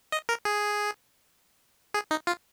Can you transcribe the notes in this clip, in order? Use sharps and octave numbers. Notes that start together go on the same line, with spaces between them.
D#5
A#4
G#4
G#4
D#4
F4